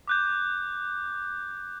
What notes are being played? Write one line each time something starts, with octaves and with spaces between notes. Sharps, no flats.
D6 F#6 G6